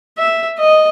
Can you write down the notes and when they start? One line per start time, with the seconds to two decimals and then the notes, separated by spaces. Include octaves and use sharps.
0.18 E5
0.59 D#5